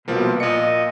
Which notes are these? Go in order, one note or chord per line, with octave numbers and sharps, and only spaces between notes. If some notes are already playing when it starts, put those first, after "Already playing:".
C2 B2 F3 A#3
A#2 D#5 C#7